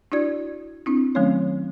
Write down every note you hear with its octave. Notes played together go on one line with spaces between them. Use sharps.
D4 E4 F#4 D5 G#6
C4 D4 E4
D#3 F#3 A3 C4 C#4 C#5